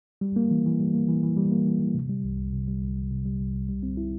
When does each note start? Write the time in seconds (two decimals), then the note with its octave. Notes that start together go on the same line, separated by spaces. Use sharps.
0.21 G3
0.36 A#3
0.51 E3
0.66 E3
0.80 G3
0.94 A#3
1.09 E3
1.23 E3
1.37 G3
1.52 A#3
1.66 E3
1.81 E3
1.95 C3
2.10 G3
2.24 C2
2.38 C2
2.52 C3
2.67 G3
2.82 C2
2.96 C2
3.11 C3
3.25 G3
3.40 C2
3.54 C2
3.69 G3
3.83 C4
3.97 E4